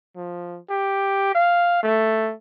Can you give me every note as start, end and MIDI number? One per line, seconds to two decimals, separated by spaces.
0.16 0.60 53
0.70 1.33 67
1.35 1.83 77
1.83 2.34 57